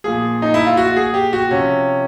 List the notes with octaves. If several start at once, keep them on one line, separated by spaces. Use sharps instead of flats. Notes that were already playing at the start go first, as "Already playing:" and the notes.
A#2 F3 G#4
D#4
E4
F4
F#4
G#4
G4
F#4
C3 F3 C#4